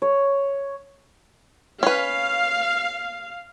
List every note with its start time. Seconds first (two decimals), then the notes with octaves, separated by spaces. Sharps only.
0.02 C#5
1.83 C#4 B4 F5